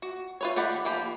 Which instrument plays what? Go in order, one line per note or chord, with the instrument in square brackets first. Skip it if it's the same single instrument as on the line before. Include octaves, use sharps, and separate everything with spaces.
[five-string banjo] F#4
F4 B4 C#5
D#3 G4 D5 F#5 B5
F3 A#3 G4 B5